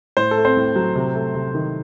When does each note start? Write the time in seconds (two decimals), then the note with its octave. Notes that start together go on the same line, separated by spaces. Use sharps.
0.17 A2 C5
0.31 A4
0.37 A3
0.45 C4 C5
0.57 A2
0.76 F#3
0.96 C3
1.15 A3
1.35 C3
1.55 D#3